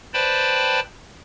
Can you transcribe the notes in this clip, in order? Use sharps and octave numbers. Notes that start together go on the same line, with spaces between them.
B4 C5 D5 G5 A5 B5